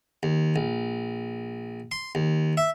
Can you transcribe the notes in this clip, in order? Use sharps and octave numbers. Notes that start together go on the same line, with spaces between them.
D#2
A#1
C6
D#2
E5